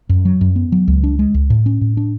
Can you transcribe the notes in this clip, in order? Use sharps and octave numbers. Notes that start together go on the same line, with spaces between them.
F#2
F#3
F#2
B3
F#3
C#2
D4
G#3
C#2
A2
C#4
A2
D4